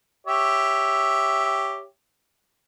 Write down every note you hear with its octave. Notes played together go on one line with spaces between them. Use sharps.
G4 C#5 E5